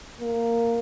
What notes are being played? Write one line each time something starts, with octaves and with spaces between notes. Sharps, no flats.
A#3